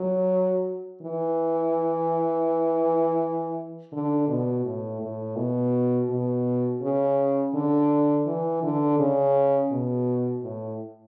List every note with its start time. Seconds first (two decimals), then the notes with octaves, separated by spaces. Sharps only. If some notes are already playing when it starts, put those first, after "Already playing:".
Already playing: F#3
1.02 E3
3.92 D3
4.28 B2
4.65 A2
5.01 A2
5.36 B2
6.09 B2
6.82 C#3
7.54 D3
8.26 E3
8.63 D3
8.99 C#3
9.72 B2
10.43 A2